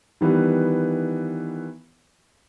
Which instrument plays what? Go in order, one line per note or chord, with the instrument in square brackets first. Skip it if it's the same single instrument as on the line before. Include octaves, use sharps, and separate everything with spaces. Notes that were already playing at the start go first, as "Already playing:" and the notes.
[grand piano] D#3 E3 G3 B3